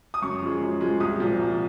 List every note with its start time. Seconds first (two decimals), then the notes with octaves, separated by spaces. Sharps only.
0.14 D#6
0.22 F#2 C#6
0.42 F3 G#3
0.61 F#2
0.81 F3 G#3
1.00 C2 D#6
1.20 A#2 F3
1.39 C2